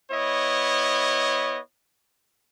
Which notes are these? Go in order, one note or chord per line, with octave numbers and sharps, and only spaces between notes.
B3 E4 C#5 D#5